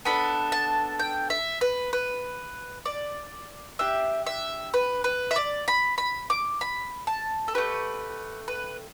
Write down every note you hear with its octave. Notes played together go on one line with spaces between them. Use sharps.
B3 D4 A4 B5
A5
G5
E5
B4
B4
D5
D4 G4 E5
E5
B4
B4
E5
D5
B5
B5
D6
B5
A5
A4
A3 D4 G4 B4
B4